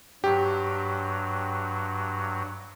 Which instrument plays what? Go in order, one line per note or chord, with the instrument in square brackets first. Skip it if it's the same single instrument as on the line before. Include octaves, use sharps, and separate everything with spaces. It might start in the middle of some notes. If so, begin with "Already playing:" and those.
[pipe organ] G2 F#3 [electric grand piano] G4